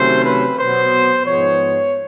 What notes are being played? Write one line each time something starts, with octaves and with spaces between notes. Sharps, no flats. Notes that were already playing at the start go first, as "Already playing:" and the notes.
Already playing: C3 D#3 F#3 A3 C#4 C5
B4
B2 F#3 B3 C5
G#2 F3 G#3 B3 C#5